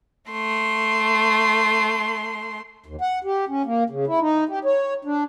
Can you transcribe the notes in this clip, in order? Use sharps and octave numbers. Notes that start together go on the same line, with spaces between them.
A3 C6
D#2
F#5
G4
C#4
A#3
C#3
E4
D#4
G4
C#5
D4